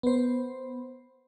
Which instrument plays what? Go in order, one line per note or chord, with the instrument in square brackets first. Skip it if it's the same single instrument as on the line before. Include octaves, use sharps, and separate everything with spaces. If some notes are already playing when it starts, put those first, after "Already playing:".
[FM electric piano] B3 C5